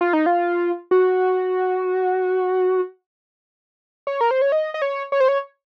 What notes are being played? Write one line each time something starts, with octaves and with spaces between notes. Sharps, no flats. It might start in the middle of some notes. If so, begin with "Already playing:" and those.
F4
D#4
F4
F#4
C#5
A#4
C5
C#5
D#5
D#5
C#5
C#5
C5
C#5